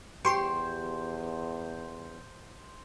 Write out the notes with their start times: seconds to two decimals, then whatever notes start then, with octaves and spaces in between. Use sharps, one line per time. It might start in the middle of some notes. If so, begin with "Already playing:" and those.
0.25 E2 G4 C5 C6 C#6